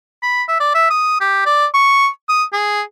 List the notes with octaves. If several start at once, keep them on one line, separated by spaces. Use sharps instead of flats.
B5
E5
D5
E5
D#6
G4
D5
C#6
D#6
G#4